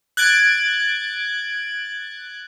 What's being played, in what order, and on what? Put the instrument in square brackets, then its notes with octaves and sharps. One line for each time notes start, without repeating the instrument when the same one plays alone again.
[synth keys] F#6 G#6 A6 D7